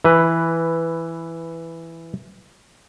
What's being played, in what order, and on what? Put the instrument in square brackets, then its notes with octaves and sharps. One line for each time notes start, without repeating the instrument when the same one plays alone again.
[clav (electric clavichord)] E3 B4